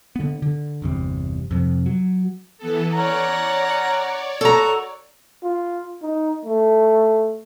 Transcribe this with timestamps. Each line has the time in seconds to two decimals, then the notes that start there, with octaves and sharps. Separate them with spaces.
0.16 D3 B3
0.42 D3
0.82 G1 E2 C3
1.51 F2 C3
1.86 F#3
2.58 E3 B3 A4
2.93 C#4 C#5 D5 F#5 A#5
4.41 F#4 A4 A#5
5.43 F4
6.02 D#4
6.45 A3